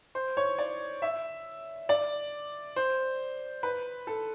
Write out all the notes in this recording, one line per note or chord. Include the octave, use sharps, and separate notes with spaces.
C5
C#5
D5
E5
D5
C5
B4
A4